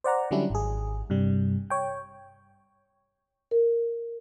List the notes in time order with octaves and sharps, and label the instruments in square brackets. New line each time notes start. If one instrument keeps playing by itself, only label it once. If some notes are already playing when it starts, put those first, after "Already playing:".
[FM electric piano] C5 D5 F#5 A#5
D3 F#3 G3 C#4 D4 E4
G#1 G#4
G2 C3 G3
C#5 G5
[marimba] A#4